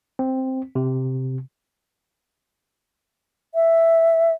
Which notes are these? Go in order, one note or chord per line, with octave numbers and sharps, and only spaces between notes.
C4
C3
E5